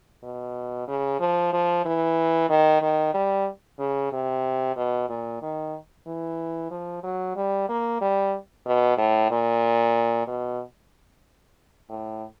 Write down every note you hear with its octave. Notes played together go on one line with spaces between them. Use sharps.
B2
C#3
F3
F3
E3
D#3
D#3
G3
C#3
C3
B2
A#2
D#3
E3
F3
F#3
G3
A#3
G3
B2
A2
A#2
B2
A2